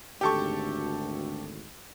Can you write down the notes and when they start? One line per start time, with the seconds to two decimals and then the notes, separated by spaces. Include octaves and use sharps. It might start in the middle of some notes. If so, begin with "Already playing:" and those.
0.21 G#1 D2 G4 A4 C#6